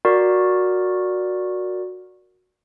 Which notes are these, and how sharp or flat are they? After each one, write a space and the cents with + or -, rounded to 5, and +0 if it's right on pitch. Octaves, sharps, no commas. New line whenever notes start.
F#4 -15 A#4 +0 D5 +0